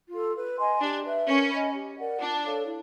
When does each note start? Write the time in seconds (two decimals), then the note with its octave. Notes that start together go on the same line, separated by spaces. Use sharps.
0.10 F4 A4
0.34 B4
0.58 D#5 G#5 C6
0.81 D4 G4
1.04 B4 E5
1.27 C#4 A#4
1.50 D#5 G#5 B5
1.74 G4
1.97 A#4 D5 F#5
2.20 D4 F4
2.44 A4 C#5 F5
2.67 E4